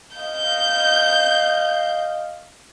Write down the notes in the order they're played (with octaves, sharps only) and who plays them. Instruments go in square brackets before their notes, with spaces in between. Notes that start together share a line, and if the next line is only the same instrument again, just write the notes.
[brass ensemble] D#5 F5 [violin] G6